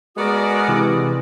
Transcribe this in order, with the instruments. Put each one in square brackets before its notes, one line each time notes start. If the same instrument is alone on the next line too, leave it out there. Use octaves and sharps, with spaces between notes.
[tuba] G#3 [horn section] B3 D5 [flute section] F#4 A#4 D#6
[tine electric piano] C3 E3